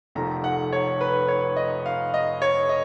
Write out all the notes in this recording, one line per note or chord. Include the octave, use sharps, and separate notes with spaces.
F1 F2 D#3 A#5
F#5
C#5
B4
C#5
D#5
F5
D#5
C#5
D#5